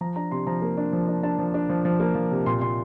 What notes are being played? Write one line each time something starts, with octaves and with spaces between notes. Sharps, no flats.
F3 A#5
D4 A#5
C3 C6
F3 A#5
A#3
D4
F3
D4
D4 A5
F3
D4
F3
F3
A#3
F3
C3
A#2 C6
A#2 C6